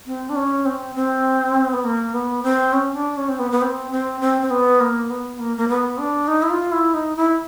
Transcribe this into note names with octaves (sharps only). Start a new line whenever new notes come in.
C4
D4
C#4
C4
C4
B3
A#3
B3
C4
C#4
D4
C#4
C4
B3
B3
C4
C4
C4
C4
B3
A#3
B3
A#3
A#3
B3
D4
D#4
E4
F4
E4
D#4
E4